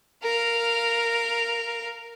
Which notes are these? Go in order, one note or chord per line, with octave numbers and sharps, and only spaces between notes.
A#4 F5